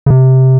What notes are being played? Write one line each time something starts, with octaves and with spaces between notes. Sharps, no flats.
C#3
C3